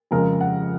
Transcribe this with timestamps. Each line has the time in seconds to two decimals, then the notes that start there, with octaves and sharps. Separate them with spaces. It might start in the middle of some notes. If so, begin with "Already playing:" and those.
0.11 F2 C#3 G#3 A#4
0.40 F#5